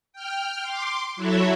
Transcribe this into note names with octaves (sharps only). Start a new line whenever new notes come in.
G5 F6
C6 D6
F#3 E4 F#4 A4 C#5 E5